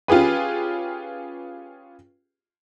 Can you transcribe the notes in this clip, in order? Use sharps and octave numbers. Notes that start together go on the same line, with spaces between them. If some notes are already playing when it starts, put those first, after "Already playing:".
C#4 F4 G4 G#4 B4